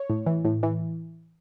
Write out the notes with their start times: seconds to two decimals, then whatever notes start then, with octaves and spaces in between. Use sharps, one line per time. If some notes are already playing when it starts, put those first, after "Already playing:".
Already playing: C#5
0.10 A2
0.27 E3
0.45 A2
0.63 E3